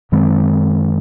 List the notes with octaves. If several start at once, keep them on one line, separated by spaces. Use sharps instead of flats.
F#2 D#3 G#3 C4